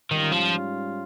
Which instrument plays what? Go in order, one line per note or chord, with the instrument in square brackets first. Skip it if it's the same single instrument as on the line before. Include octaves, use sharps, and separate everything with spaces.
[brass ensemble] G#2 G3 C#4 F4 [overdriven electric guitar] D#3
[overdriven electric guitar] F3